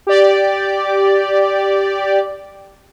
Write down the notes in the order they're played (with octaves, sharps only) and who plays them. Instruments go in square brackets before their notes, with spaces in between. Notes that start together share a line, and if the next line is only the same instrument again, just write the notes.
[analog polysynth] G4 D5